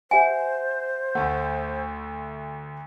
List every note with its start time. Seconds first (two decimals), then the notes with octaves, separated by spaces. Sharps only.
0.11 G4 C5 E5 F#5 G#5
1.15 D2 A3 F#5